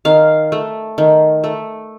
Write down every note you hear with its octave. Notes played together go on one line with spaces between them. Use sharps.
D#3 F5
A3
D#3
A3